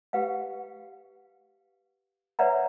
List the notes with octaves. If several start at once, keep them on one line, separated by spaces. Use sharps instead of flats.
G4 B4 F5 F#5
B4 C#5 D5 E5 F#5 A#5